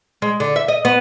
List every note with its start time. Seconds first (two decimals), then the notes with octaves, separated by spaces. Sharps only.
0.22 G#3
0.40 D3
0.56 E5
0.68 D#5
0.85 B3